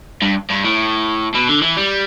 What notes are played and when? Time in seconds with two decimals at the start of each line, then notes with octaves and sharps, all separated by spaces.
0.22 G2
0.50 G2
0.64 A2
1.34 B2
1.48 D3
1.62 E3
1.77 G3